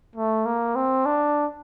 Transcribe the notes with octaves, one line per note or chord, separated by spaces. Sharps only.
A3
A#3
C4
D4